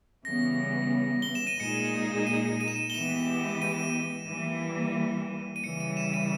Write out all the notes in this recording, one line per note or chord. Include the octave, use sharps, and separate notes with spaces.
C#3 E3 G3 B3 A#6
G7
E7
D#7
A#2 G#3 D#4 G#4 C#7
D#7
D#7
E7
D#7
G7
E3 G#3 B3 G4 E7
D#7
E3 G3 A#3
D#7
C#3 E3 G3 C#7
D#7
E7
D#7